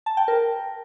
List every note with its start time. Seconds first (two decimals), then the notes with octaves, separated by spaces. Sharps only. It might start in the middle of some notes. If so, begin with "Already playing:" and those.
0.06 A5
0.17 G5
0.28 A#4